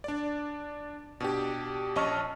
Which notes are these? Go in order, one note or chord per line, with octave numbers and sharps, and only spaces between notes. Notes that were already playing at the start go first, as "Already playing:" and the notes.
D4 D5
B2 D4 G4
A#1 C#4 D#5 A5 C#6 F6